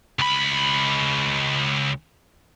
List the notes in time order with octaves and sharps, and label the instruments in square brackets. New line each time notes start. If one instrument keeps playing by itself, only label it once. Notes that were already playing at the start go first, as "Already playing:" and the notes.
[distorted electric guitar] C#2 B5